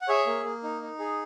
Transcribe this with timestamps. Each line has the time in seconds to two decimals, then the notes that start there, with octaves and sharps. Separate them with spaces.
0.02 F#5
0.08 G#4 C#5 E5
0.27 A#3
0.44 A#3
0.63 D#4
0.82 D#4
0.99 G#4